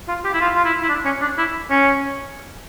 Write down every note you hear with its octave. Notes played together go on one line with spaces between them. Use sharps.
F4
G4
E4
F4
F4
E4
E4
D4
C#4
D4
E4
C#4